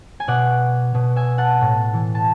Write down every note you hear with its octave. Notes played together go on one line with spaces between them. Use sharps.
G#5
B2 D5 F#5
B2
E5 G#5
F#5 A5
A2
E3
A5